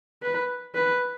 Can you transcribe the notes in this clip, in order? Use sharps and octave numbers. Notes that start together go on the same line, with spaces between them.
B4
B4